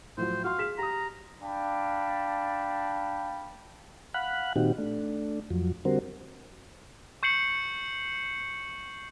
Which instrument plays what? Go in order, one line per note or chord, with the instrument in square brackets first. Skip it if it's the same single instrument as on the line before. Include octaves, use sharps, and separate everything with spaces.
[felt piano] A2 F3 F#3 [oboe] C5
[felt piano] F#4 C6 [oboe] F5
[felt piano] G#4 B6 E7
[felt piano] G4 D#6 [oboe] A#5
[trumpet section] D4 F5 G5 A5 B5
[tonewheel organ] F5 F#5 B5 F#6
A#2 D#3 C4 D#4 F#4 G4
A3 D4
F2 F3 F#3
D3 G3 C4 F#4 A#4 C5
[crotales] C#6 G6 C7 C#7 F#7